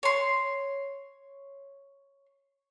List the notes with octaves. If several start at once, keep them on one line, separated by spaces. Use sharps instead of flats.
C#5 C6